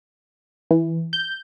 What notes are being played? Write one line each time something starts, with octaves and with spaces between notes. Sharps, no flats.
E3
G6